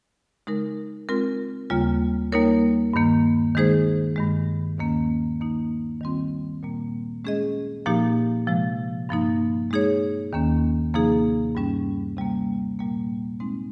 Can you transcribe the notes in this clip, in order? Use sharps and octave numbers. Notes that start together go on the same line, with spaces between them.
C#3 G#3 D#4 A#4
G#3 C4 F4 A#4
D#2 C#3 G3 A#3 F4
G3 A#3 D#4 A#4 C#5
G2 D#3 A#3
D#3 G#3 D#4 G#4 C5
G2 D#3 G#3
D#2 D#3 A#3 C#4
D#3 A#3 D#4
D#3 G3 C4 F4
A#2 G3 A#3
G#3 C#4 G#4 D#5
A#2 F3 A#3 D#4 G4
C3 F3 G#3
G2 F3 A#3 D#4
G#3 D#4 G#4 C#5
D#2 D#3 A#3 C#4
C3 F3 A#3 D#4 G#4
G2 G3 C#4
C3 G3 A#3
A#2 G3 A#3
G#3 C4 D#4